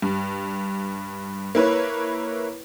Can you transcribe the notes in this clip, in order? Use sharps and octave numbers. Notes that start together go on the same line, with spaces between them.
G2
A#3 E4 B4 C#5